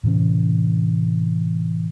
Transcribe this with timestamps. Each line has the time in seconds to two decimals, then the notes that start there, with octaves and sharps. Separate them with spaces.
0.03 A2 C3 E3 C#4